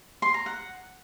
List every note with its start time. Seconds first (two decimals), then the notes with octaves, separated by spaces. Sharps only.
0.22 C6
0.34 A#5
0.46 F#5